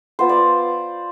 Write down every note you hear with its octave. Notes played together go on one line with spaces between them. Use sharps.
B3 F4 C5
D5